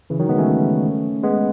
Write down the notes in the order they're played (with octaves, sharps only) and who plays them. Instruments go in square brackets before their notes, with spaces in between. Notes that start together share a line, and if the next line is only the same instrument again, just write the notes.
[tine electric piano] C#3 E3
D#3 F#3
G#3 B3
A3 C#4
G#3 B3